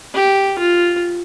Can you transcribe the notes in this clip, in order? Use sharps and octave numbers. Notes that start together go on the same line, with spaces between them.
G4
F4